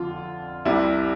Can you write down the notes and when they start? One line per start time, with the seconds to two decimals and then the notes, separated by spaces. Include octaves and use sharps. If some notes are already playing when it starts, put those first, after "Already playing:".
Already playing: F2 D3 F4
0.65 C2 C3 G3 E4